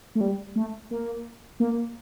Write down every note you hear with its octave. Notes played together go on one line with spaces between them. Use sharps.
A3
G3
A3
A#3
A#3